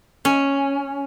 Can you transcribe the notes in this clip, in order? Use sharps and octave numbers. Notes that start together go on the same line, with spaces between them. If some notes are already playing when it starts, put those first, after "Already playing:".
C#4